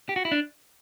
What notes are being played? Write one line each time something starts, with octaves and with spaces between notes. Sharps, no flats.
G4
F#4
E4
D4